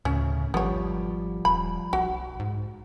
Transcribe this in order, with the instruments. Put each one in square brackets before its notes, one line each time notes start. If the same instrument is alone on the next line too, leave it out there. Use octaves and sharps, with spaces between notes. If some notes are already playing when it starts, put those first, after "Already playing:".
[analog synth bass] D2 [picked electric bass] A2 C#3 [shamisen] C#4
[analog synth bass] G#1 [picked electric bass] F3 G3 [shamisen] B3 C#5
[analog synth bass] D#1 [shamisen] B5
[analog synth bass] B1 [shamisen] F#4
[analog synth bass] G#2